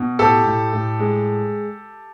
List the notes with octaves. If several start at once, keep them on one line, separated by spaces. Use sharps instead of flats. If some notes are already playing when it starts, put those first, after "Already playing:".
Already playing: B2
A2 G4 A4
A2
A2
G#3